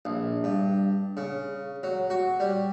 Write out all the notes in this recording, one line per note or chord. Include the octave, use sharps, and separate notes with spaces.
A#1
G2
C#3
F#3
F#4
G3